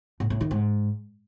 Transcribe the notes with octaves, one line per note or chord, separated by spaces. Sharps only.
A2
A2
D#3
G#2